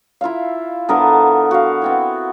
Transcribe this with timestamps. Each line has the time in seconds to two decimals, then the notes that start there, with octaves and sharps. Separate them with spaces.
0.21 E4 F4 E5 F5
0.89 D3 B3 A#4 A5
1.51 F#4 F5
1.82 B3 C4 E4